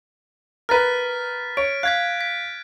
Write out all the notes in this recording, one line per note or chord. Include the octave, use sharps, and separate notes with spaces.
A#4 B4 F6 A6 B6
C#5 D7
F5 F#6 G#6 B6
B6